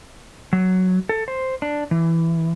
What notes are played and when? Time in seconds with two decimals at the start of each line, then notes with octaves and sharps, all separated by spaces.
0.53 F#3
1.09 A4
1.28 C5
1.62 D4
1.91 E3